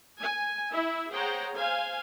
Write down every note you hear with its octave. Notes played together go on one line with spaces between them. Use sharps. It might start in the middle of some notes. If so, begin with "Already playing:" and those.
G#5
E4 E5
G#4 C5 C#5 F#5 G5 A#5
C5 F5 G#5